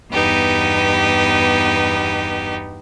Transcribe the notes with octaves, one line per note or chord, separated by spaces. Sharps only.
E2 G2 B3 D#4 G4 B4